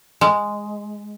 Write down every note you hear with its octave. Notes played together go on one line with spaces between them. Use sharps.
G#3